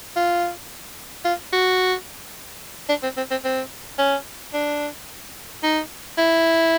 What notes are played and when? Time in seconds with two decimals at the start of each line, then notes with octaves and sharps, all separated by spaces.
0.16 F4
1.25 F4
1.53 F#4
2.89 D4
3.03 C4
3.17 C4
3.31 C4
3.44 C4
3.98 C#4
4.54 D4
5.63 D#4
6.18 E4